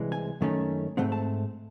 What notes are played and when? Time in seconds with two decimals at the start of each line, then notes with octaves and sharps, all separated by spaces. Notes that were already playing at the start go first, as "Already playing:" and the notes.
Already playing: C2 E3 G#3
0.12 G#5
0.41 F#2 D#3 A3 C#4
0.97 G#2 D#3 A3 C4 F#5
1.12 A5